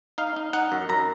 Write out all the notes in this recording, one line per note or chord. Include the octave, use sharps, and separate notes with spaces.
D#4 F5
D#4
D#4 F#5
F#2
F#2 A#5